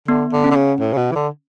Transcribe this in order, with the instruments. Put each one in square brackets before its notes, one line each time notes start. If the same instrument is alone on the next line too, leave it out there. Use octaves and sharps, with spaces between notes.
[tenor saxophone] D3 [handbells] B3
[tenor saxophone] D3
[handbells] C#4
[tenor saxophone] D3
C#3
A2
C#3
B2
E3
D3